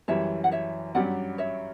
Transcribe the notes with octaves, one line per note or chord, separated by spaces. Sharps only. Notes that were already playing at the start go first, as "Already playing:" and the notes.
F#2 E3 G3 C#5 E5
F#5
C#5 E5
G2 F#3 C#4 G4 D5 F#5
C#5 E5